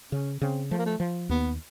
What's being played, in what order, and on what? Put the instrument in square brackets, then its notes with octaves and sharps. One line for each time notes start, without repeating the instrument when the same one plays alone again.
[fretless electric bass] C#3 [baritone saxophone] C#4
[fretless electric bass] C#3 [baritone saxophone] C4
[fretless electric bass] F3 [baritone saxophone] A3
[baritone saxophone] A#3
A3
[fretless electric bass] F3
[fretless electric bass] D#2 [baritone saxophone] B3